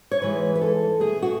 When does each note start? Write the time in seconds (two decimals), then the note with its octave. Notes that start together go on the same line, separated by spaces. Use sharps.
0.11 C#5
0.22 G#2 E3 G#3 B4
0.56 B4
0.61 A4
1.00 B2 A3 G#4
1.22 F#4